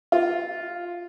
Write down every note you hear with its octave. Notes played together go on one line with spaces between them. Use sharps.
F4